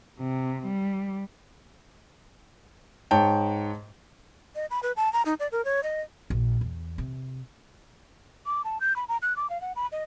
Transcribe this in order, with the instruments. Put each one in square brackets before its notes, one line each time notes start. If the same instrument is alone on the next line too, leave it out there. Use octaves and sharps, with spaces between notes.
[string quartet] C3
G3
[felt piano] G#2 C#5 G5 A5
[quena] D#5
B5
B4
A5
A#5
D#4
D5
A#4
C#5
D#5
[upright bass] A#1
E2
C3
[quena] D6
A5
G6
B5
A#5
F#6
D6
F5
F#5
B5
D#5